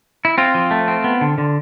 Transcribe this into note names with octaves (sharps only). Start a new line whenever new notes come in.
E4
C4 F4
F3
A3
C4
B3
D3
D3